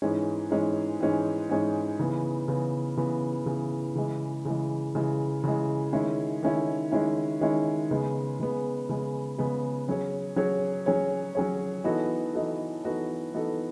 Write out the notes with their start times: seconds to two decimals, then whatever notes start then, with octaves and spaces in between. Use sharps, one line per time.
0.02 G#2 E3 G#3 C#4
0.50 G#2 E3 G#3 C#4
1.00 G#2 E3 G#3 C#4
1.49 G#2 E3 G#3 C#4
1.99 C#3 E3 B3
2.48 C#3 E3 B3
2.97 C#3 E3 B3
3.46 C#3 E3 B3
3.95 C#3 E3 G#3
4.45 C#3 E3 G#3
4.95 C#3 E3 G#3
5.44 C#3 E3 G#3
5.93 D#3 G#3 C#4 E4
6.43 D#3 G#3 C#4 E4
6.92 D#3 G#3 C#4 E4
7.41 D#3 G#3 C#4 E4
7.91 C#3 G#3 B3
8.40 C#3 G#3 B3
8.89 C#3 G#3 B3
9.38 C#3 G#3 B3
9.88 F#3 C#4 G#4 C#5
10.36 F#3 C#4 G#4 C#5
10.86 F#3 C#4 G#4 C#5
11.35 F#3 C#4 G#4 C#5
11.84 E3 B3 D#4 F#4 A4
12.33 E3 B3 D#4 F#4 A4
12.83 E3 B3 D#4 F#4 A4
13.33 E3 B3 D#4 F#4 A4